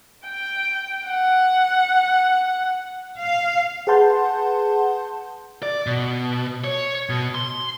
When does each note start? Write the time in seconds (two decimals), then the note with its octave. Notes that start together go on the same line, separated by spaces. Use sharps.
0.25 G5
1.08 F#5
3.16 F5
3.87 G#4 B4 F#5 A5 C6 G6
5.63 D5
5.86 B2
6.64 C#5
7.09 B2
7.35 C6